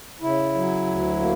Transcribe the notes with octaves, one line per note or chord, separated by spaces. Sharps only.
C#3 E4
F#3
D2
A#3